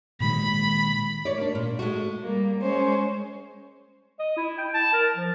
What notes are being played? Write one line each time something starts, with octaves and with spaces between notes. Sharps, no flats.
A#2 D#3 G#3 B5
C#5 D5
A#3 D4
A#2
G#3 A3 F#4
G3 A#3
G#3 C#4 C5
D#5
E4
G5
A5
A#4
F3